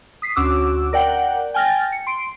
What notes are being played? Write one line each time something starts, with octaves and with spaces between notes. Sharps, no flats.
D#6 B6 C7
D2 C#4 F#4 D6 E6
A#4 D5 F#5 G5
G5 G#5 F6 A6 A#6
C#7
C6 D7